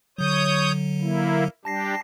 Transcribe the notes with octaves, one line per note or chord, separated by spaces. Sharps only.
D3 F#3 C#5 D#6 G6
A#3 E4
G3 D4 G4 A5 A#6 C7